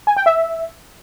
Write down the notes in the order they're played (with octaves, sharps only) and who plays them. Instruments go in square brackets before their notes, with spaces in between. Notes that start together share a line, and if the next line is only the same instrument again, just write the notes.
[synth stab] G#5
G5
E5